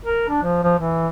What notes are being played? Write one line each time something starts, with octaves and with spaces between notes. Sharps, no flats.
A#4
D4
F3
F3
E3